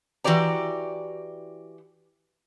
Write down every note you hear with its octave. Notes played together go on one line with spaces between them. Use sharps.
E3 F#4 G4 D5 A#5